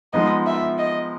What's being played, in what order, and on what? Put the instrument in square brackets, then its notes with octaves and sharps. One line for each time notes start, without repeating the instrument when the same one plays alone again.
[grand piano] F3 G#3 B3 D#4 [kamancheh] D#5
[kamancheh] E5
D#5